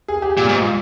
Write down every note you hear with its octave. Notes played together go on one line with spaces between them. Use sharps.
G#4
G4
A#2 F4
G#2
F4